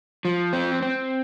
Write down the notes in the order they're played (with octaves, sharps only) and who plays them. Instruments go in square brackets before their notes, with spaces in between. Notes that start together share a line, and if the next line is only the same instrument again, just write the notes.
[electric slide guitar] F3
C4
C4